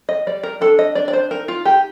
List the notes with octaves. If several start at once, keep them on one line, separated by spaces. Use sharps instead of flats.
D#5
G3 D5
A#4
D4 A4
D#5
D4 D5
D5
C5
D#4 A#4
F4
D#4 G4